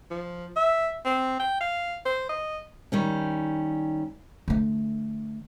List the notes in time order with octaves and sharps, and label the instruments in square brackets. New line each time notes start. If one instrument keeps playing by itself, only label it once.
[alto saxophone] F3
E5
C4
G5
F5
C5
D#5
[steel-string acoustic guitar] D#3 G3 C#4
[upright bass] D3 A3